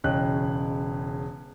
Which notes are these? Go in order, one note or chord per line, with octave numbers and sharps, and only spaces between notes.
E1 C#3 C#5 D#5 G5 F#6